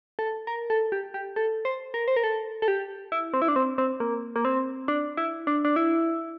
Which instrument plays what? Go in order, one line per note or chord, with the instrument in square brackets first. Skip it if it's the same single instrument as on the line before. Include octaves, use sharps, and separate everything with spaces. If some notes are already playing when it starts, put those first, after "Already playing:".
[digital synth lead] A4
A#4
A4
G4
G4
A4
C5
A#4
C5
A#4
A4
A4
G4
E4
C4
E4
D4
C4
C4
A#3
A#3
C4
D4
E4
D4
D4
E4